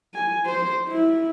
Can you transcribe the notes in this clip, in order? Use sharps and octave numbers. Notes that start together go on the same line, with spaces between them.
G#5
C5
E4